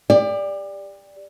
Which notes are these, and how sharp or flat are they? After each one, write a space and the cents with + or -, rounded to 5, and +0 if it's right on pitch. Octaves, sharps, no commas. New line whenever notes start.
G4 +30 D5 +0